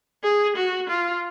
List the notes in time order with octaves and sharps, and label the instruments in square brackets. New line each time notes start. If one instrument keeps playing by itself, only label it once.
[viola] G#4
F#4
F4